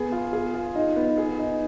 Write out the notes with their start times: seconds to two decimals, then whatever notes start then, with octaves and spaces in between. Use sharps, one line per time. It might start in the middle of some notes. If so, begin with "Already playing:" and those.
Already playing: B3 G#4
0.12 F4
0.33 G#4
0.54 F4
0.75 D#4
0.96 B3
1.17 G#4
1.39 D#4